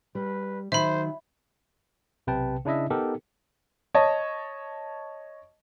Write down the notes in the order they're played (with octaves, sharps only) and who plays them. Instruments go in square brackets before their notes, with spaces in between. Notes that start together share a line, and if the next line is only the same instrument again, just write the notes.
[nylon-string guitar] G3 [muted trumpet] B4
[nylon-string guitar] D#3 E3 F#3 [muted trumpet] C5 [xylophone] E5 B5
[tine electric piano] B1 C3 B4 G5 A5
C#3 D4 E4 D#5 E5
B3 D#4 G4 A4 A#4
[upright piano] C#5 D#5 A5